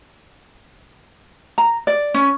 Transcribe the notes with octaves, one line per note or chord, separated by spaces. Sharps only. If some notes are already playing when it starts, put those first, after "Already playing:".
A#5
D5
C#4